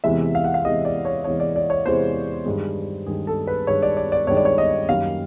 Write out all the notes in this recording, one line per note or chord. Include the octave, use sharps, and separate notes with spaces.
E2 C3 E3 G#3 E5
F5
F#5
F5
E2 C3 E3 G#3 D#5
D5
C#5
E2 C3 E3 G#3 C#5
D5
D5
C#5
E2 C3 E3 G#3 C5
G2 D#3 G#3
G2 D#3 G#3 G#4
A4
B4
G2 D#3 G#3 C#5
D5
D5
D5
G2 D#3 G#3 C#5
D5
C#5
D#5
F#2 D#3 G3 A#3 F5